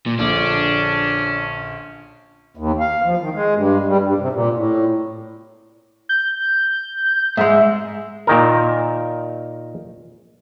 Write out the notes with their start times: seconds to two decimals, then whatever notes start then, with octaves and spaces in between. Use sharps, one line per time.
0.06 A#2
0.19 A#1 D3 C#4 D4
2.57 D#2
2.80 F5
3.05 F3
3.21 D#3
3.34 G#3
3.55 G2
3.88 G3
4.03 G2
4.19 C3
4.32 A#2
4.55 A2
6.09 G6
7.37 G#2 G#3 E5
8.27 A#2 D#3 A#4